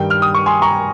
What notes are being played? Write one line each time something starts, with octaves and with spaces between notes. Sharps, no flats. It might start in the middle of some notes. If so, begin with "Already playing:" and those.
Already playing: G2 D#3 G3 G5
F6
D#6
C#6
G#5 C6
A#5 C#6